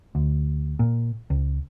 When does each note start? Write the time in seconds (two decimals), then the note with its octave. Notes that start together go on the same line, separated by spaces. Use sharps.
0.15 D2
0.79 A#2
1.30 C#2